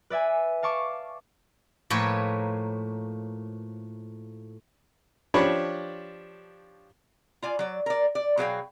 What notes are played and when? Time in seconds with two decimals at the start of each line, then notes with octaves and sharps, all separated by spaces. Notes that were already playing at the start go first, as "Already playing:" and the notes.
0.10 B4 D5 E5 G#5
0.63 F5 A5 C#6 D6
1.90 A2 F3 A#3 A#4 B4 C#5
5.34 F3 D4 G4 C#5 B5 C#6
7.42 F4 D5 G#5
7.59 F#3 D5
7.86 A#4 D5
8.15 D5
8.37 B2 F#3 G#4 D5 F5 G5